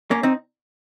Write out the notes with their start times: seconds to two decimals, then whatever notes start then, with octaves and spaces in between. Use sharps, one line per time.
0.11 A#3 C#4
0.23 C4 D#4